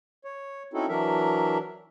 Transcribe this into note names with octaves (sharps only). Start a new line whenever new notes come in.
C#5
C4 C#4 D#4 E4 F#4 A4
E3 F#3 D4 A#4 E5